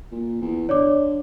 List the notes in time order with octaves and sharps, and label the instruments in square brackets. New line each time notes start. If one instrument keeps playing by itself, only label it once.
[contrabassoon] A#2
E2
[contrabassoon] D3 [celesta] C#5 D5 D6